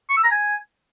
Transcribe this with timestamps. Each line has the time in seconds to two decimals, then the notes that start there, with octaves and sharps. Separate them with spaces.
0.10 C#6
0.17 E6
0.24 A#5
0.31 G#5